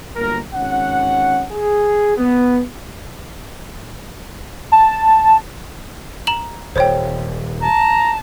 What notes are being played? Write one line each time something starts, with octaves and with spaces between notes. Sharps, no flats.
G1 F#3 A#3 A#4
G#1 C#4 F#5
G#4
B3
A5
A#5 E7 F#7
D#1 C5 C#5 G5
A5 A#5